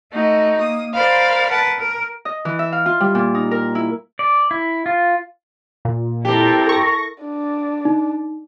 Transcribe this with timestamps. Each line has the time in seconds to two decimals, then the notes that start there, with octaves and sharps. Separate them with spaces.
0.13 A3 D#4 F#4
0.59 A#3 D#6
0.94 A#4 C5 D5 F5 B5
1.49 A#4 B4 F#5 A5
1.79 A#4
2.25 D#5
2.45 E3
2.59 E5
2.72 F5
2.86 F4
3.00 G3
3.15 A#2
3.35 D#4
3.51 A#4
3.75 E4
4.19 D5
4.51 E4
4.86 F4
5.85 A#2
6.25 C4 E4 G4 A4 A#4
6.69 C#6 A#6
7.22 D4
7.85 D#4